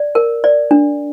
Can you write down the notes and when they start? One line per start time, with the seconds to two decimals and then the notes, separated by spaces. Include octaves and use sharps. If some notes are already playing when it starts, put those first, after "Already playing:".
Already playing: D5
0.15 A#4
0.44 D5
0.71 D4